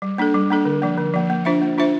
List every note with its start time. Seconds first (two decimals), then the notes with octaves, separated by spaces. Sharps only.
0.02 G3
0.18 A#3 D4 A4
0.34 G3
0.50 A#3 D4 A4
0.65 D3
0.82 F3 A#3
0.97 D3
1.14 F3 A#3
1.30 A#3
1.45 D4 F4 C5 E5
1.62 A#3
1.78 D4 F4 C5 E5